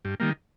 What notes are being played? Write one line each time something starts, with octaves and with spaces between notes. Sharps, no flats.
G2
D#3 G3 A#3